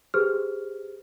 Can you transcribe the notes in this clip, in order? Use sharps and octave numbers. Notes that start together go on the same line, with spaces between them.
G4 G#4 B4 C5 F6